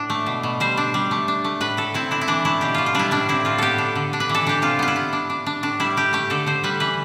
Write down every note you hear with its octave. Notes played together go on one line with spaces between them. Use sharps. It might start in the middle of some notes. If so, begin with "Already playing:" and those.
Already playing: A2 D4
A3
B2
B2
G3 C5
D4
G3
A3
D4
A3
A2 B4
A2 A4
C4 E4
D4 E4
E4
E3 D4
A3 E4
B2 G4
B2 F4
F4
G3 D4 E4
A2 D4
C4 E4
A2 F4
B3 G4 A4
D4
D3
D4
B4
E3
A4
D4 G4
C3 F4
B3 F4
E4
B3
D4
D4
D4
A2 D4
G3 E4
D4 G4
A3 G4
D3 A4
D3 C5
G3 B4
E3 B4